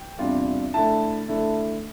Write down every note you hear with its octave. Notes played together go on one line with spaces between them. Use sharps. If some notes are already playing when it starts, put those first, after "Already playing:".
Already playing: G5
E2 C3 G3 D4 F4
D3 A3 E4 A5
D3 A3 E4